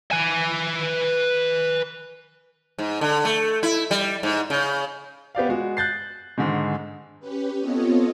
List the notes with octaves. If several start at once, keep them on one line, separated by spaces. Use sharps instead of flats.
B4 G#5
G#2
D3
A3
E4
G3
G#2
C#3
B3 G4 D5 F5
G#3 F#4
F#6 G6 A6 C7
G#2 D3 D#3 G#3
C#4 G4 B4
B3 C4 F4 A4 C#5 D#5